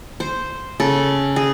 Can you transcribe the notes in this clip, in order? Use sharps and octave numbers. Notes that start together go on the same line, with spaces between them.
C5
C#3 A4
G#4